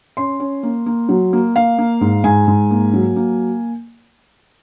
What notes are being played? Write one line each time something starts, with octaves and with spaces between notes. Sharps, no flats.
C#4 C6
C#4
A#3
A#3
F#3
A#3
A#3 F5
A#3
G#2
G#2 G#5
G#2
A#3
F#3
A#3